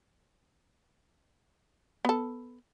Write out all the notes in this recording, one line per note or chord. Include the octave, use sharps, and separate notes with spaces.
B3 A4